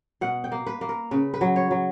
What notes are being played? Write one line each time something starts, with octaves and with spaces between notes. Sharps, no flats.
B2 F#5
G5
A#3
B4
A#3
A#4
C#3 B4
B4
F#3
C#5
F#3